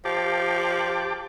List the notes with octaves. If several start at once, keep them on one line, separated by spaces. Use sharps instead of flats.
F3 G4 A5 D6